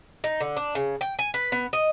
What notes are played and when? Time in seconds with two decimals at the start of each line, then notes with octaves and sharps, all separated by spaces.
0.24 D#4
0.40 D3
0.57 D4
0.75 C#3
1.01 G5
1.19 G#5
1.34 B4
1.52 B3
1.73 D#5